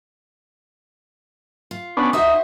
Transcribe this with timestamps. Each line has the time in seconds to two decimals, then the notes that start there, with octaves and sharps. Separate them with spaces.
1.71 F4
1.97 B3 C#4 D4
2.13 D#4 F#4 C5 E5